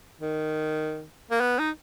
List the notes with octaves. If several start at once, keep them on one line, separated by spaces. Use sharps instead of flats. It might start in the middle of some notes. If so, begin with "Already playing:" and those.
D#3
A#3
B3
D#4